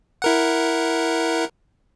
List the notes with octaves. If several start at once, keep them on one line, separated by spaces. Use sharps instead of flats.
E4 A#4 F#5